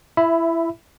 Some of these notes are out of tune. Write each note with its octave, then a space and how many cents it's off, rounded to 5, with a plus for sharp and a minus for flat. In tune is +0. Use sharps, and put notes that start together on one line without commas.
E4 +20 E5 +0 B5 +0